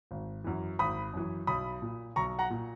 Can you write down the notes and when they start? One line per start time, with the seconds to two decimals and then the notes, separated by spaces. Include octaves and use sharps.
0.11 G#1
0.44 F#2 E3
0.79 G#1 B5 D#6
1.14 F#2 E3
1.47 B1 B5 D#6
1.82 A#2
2.16 B1 A#5 C#6
2.39 F#5 A#5
2.50 A#2